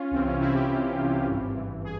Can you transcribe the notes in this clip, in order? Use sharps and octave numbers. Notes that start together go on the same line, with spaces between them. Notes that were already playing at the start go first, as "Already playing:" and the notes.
Already playing: C#4 F4
C2 C3 E3 C4
C#4
C2 C3 E3 C4 E4
E4 G4
C2 C3 E3
C2 C3 E3
G#1 G2 E3
G#1 G2 E3
G#4